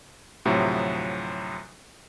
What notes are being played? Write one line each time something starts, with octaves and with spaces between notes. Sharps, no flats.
D2 A2 C3 F3 F#3